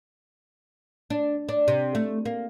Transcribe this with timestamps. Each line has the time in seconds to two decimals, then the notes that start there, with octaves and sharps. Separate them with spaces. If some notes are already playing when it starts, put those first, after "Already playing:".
1.10 D4
1.49 D4
1.68 C3
1.95 A3
2.25 A#3